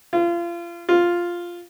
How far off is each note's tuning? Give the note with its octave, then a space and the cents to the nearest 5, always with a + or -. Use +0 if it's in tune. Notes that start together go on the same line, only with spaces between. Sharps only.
F4 -30
F4 +0